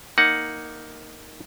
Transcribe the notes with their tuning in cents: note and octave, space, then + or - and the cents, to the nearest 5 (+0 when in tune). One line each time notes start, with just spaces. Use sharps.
A#3 +0 D#4 +0 F#5 +0